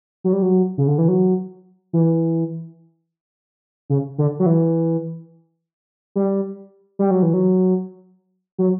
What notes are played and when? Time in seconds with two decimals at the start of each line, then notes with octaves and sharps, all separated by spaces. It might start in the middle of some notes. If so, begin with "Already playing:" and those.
0.24 F#3
0.33 G3
0.42 F#3
0.78 C#3
0.87 D3
0.98 E3
1.08 F#3
1.93 E3
3.90 C#3
4.18 D3
4.40 F#3
4.46 E3
6.16 G3
6.99 G3
7.11 F#3
7.23 E3
7.34 F#3
8.58 F#3